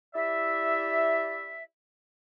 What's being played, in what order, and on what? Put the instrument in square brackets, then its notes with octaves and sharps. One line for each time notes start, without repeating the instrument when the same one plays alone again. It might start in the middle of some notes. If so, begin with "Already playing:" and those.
[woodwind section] E4 G4 D5 E5